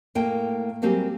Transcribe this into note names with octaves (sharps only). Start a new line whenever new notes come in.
A2 A#3 G5
F#3 G3 A#3 C4 G4 G#4